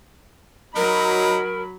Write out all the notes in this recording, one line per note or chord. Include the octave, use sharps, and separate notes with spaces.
F#3 D#4 A#4 B5